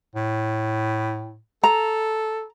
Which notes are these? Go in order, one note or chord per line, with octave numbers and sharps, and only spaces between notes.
A2
A4 A#5